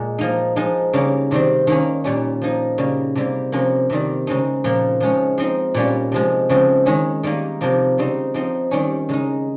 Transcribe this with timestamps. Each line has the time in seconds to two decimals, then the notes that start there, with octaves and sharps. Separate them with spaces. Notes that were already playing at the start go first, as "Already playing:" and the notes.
Already playing: A#2 G#3
0.19 F3 A#3 D#4
0.56 F3 G#3 D#4
0.93 C#3 G3 A#3 C#4
1.31 C3 D#3 G3 C4
1.67 D#3 A#3 C#4
2.04 A#2 G3 C#4
2.42 F3 A#3 D#4
2.78 C#3 G3 A#3
3.15 C3 G3 A#3
3.52 C3 F3 A#3 C#4
3.90 C3 D#3 G3
4.27 C#3 G#3 C4 D#4
4.64 A#2 F3 A#3
5.00 F3 G#3 C#4
5.38 F3 C4 D#4
5.74 A#2 G3 A#3 C#4
6.12 C3 F3 G#3
6.49 C#3 F3 G#3 C4
6.86 D#3 G#3 C#4
7.23 D#3 G3 A#3 D#4
7.61 C3 F3 A#3
7.98 C#3 G3 C4 D#4
8.34 F3 C4 D#4
8.71 D#3 G3 C#4
9.09 C#3 G#3 D#4